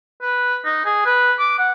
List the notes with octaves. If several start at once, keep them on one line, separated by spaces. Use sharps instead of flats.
B4
D#4
G#4
B4
D6
F#5